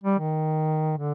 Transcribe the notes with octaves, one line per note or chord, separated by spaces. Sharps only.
G3
D#3
D3